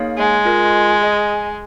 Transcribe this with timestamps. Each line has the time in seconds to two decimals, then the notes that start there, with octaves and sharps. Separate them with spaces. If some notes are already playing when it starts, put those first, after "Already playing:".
Already playing: A#3 D#4 G#4 C#5 F5
0.17 G#3
0.45 F4 A#4 D#5
1.01 G#4 D#5 G#5